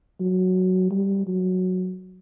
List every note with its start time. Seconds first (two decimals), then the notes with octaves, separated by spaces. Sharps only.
0.20 F#3
0.91 G3
1.27 F#3